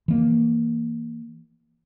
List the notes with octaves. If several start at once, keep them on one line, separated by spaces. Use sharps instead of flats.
E3 A#3